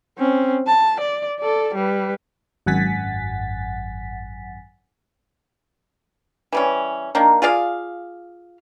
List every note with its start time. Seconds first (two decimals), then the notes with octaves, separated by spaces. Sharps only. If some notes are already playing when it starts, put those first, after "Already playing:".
0.18 C4 C#4
0.67 A5
1.01 D5
1.40 A4 D5
1.75 G3 B4
2.66 G#1 F#2 F#5 G#5 A6 B6
6.52 E3 G3 C#4
7.15 D#3 A#3 D4
7.42 F4 G#4 D5 F5